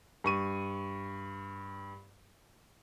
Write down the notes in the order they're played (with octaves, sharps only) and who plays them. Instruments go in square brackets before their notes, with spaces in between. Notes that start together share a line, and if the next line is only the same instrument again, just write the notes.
[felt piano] G2 C#6 D#7